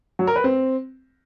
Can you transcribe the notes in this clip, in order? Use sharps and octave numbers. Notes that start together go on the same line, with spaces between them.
F#3
A#4
B4
C4